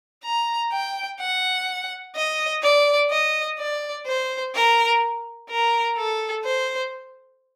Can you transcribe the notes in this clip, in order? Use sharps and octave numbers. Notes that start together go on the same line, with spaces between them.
A#5
G5
F#5
D#5
D5
D#5
D5
C5
A#4
A#4
A4
C5